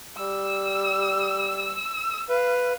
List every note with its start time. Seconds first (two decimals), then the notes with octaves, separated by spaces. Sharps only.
0.17 G3 E6
2.29 B4 F5